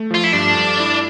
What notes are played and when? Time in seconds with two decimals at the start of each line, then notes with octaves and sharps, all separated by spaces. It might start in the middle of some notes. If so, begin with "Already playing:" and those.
Already playing: A3
0.11 F3 F4
0.24 E4
0.33 G2 D4
0.57 G2
0.80 E4